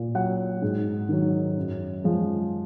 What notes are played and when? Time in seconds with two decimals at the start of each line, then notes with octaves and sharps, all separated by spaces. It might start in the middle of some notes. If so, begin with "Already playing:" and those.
Already playing: A#2
0.15 F#3 F#5
0.62 G#2
1.09 D#3 F#3
1.57 F#2
2.04 F3 G#3